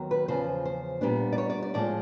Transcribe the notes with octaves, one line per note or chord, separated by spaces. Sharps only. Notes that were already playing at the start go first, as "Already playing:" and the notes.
Already playing: D#2 D#3 F#3 B3
B4
E2 C#3 F3 C5
C5
A#2 G3 B3 D4
D5
C#5
D5
D5
A2 F3 G#3 D5